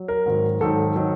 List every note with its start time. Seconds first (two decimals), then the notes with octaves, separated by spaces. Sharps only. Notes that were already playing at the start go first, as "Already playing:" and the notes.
Already playing: F#3
0.08 A#4
0.26 G#2 D#3 F#3
0.61 G#2 D#3 F#3 A4
0.96 D#3 F#3